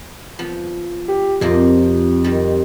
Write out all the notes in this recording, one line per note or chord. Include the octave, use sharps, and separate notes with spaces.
F3 B3
G4
F2 C3 F3 A#3
D#3 G3